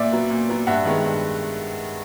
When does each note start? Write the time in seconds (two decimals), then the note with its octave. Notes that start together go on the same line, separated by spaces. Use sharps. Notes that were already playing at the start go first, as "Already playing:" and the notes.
Already playing: A#2 D5 E5
0.12 F#3 B3
0.30 A#2
0.49 F#3 B3
0.67 G2 E5 F#5
0.85 D#3 G#3 B3
1.04 G2